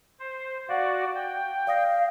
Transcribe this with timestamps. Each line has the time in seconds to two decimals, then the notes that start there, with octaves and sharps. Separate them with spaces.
0.20 C5
0.69 F#4 D5 F5 F#5
1.15 G5
1.67 D5 F5 D#6 A#6